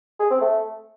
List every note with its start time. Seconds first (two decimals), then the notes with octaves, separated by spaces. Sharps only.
0.20 G#4
0.30 C4
0.41 A3